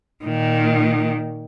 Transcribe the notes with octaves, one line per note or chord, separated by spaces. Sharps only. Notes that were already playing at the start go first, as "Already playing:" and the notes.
A#2 D#3